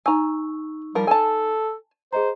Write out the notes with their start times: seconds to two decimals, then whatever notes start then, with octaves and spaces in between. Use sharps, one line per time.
0.06 D#4 G#5 A#5 C#6 E6
0.95 F3 G3 A#4
1.07 A4 G#5 A5
2.13 G#4 C5 D#5 A#5